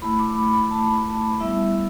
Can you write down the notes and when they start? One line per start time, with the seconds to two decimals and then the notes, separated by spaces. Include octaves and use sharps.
0.02 A3 E4 B5
0.19 D6
0.36 B5
0.53 B5
0.71 A5
1.40 G3 B3 E4 E5